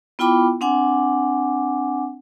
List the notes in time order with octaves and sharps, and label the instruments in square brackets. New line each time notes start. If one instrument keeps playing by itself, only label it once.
[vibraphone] B3 E4 F4 G5 B5 D6
C4 D4 F#5 G#5 D6